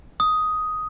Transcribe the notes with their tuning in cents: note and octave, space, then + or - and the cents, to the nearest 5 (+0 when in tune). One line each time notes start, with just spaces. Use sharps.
D#6 +5